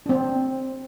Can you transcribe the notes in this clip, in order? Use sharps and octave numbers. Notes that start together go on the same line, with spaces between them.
C4 D4